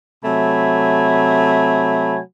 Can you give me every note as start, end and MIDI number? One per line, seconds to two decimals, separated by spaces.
0.24 2.19 48
0.24 2.19 54
0.24 2.19 57
0.24 2.19 80
0.24 2.19 83